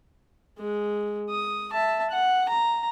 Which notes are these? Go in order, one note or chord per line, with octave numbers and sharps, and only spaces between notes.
G#3
D#6
E5 A5
F#5
A#5